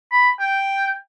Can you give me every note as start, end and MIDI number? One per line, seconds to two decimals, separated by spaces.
0.12 0.30 83
0.40 0.93 79